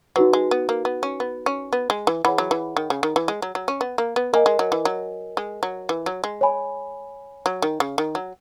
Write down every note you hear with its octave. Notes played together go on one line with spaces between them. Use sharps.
F#3 D#4 F#4 B4
G#3
B3
A#3
B3
C#4
B3
C#4
B3
G#3
E3
E3 G#4 C#5 F#5 B5
F#3
E3
D#3
C#3
D#3
E3
G#3
F#3
F#3
C#4
B3
A#3
B3
A#3 A#4 D#5 G#5
G#3
F#3
E3
F#3
G#3
F#3
E3
F#3
G#3
C#5 G#5 B5
F#3
D#3
C#3
D#3
F#3